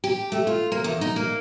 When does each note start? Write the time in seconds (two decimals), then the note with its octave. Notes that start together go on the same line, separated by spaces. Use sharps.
0.04 G4
0.32 A3
0.47 F4
0.72 A#3
0.84 E2
1.01 D#4
1.16 A#3